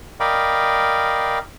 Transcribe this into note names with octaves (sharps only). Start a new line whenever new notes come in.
A#4 D5 D#5 F5 G5 B5